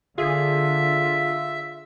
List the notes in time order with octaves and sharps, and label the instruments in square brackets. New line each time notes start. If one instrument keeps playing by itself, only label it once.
[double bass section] D3 [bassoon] F4 [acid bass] G#4 [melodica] E5